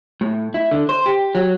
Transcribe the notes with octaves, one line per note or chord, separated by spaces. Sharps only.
A2
E4
D3
C5
G4
F#3